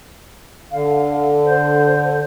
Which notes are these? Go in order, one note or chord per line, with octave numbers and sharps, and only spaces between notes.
D3 F5
C5